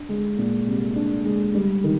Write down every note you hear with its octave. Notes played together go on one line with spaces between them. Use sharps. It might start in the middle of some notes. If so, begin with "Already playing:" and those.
Already playing: D4
G#3
A#2
C2
D4
G#3
G3
D#3